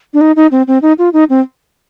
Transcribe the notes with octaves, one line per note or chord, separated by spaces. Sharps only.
D4
D#4
D#4
C4
C4
D#4
F4
D#4
C4